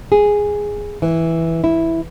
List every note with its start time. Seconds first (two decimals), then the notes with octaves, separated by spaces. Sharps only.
0.12 G#4
1.02 E3
1.64 E4